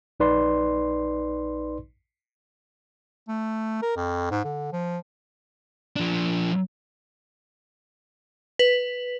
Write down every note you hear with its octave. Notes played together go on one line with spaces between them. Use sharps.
A#1 D#4 B4 D5 C6
A3
A#4
F2
G#2
D3
F3
F3 D4
B4